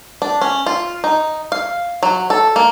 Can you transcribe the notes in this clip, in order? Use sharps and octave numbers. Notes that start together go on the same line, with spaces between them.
D4
C#4
F4
D#4
F5
F#3
A4
A#3